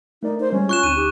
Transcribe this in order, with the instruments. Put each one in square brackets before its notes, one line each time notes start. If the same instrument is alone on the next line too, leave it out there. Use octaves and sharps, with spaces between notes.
[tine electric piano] A3 A#4 D5 [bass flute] D#4
[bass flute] C5
[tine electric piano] G3 G#3 [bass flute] C#4
[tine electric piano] F4 [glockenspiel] C#6 F#6 E7
[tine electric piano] D2 D#4 F#6 [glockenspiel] D#7 E7
[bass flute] G4